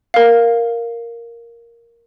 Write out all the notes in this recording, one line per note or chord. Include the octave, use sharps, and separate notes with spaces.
A#4 F5